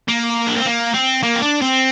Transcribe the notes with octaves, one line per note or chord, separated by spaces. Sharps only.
A#3
D4
C4
A#3
C4
A#3
C4
D4
C4